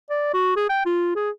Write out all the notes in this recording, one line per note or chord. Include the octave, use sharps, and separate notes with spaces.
D5
F#4
G#4
G5
F4
G#4